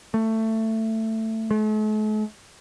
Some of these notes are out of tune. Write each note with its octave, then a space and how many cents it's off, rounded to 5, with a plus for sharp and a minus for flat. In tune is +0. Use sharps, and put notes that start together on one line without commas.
A3 +15
A3 -45